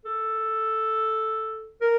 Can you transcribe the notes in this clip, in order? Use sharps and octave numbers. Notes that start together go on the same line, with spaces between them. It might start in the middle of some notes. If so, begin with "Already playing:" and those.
A4
A#4